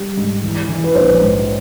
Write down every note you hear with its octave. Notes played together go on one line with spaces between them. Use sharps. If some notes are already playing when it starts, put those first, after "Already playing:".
Already playing: G3
G#2
E3
E3
B4
A#1 C5
G#2